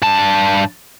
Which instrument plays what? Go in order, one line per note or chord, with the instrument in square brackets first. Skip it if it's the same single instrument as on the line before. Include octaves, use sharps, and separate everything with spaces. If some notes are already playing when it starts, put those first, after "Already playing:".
[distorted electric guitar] G2 A5